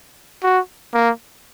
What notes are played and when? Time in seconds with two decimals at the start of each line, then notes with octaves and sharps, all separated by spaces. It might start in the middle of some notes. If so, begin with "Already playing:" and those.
0.43 F#4
0.94 A#3